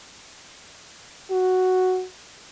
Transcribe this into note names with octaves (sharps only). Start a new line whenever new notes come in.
F#4